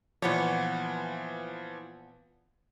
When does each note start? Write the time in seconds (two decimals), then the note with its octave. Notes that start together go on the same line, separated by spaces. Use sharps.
0.22 A#2 E3 F3 B3 C#5